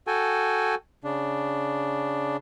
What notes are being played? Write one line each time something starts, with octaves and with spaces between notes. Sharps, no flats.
F#4 A4 G5 G#5
C#3 D4